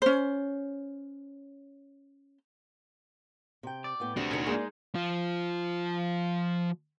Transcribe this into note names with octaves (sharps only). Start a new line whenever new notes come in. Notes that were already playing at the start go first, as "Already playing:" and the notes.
C#4 C5
C3 G5
D5
A2 B3 G5
C4 D4 F#4 G4 A4
B2 D#3 C#4
G#3 A#3 D#4 G#4 D5
F3 F4